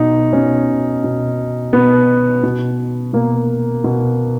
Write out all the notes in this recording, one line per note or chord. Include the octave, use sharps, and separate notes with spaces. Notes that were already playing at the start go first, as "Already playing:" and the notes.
Already playing: B2 D#4
B2 C#4
B2
B2 B3
B2
B2 A#3
B2